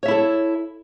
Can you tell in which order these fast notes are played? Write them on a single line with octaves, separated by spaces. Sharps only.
C#5 E5 E4 A4